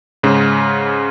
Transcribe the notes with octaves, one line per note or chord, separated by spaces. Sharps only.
G#2 C#3